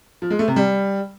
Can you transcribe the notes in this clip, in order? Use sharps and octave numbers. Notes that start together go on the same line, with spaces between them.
F3
G#3
A3
C3
G3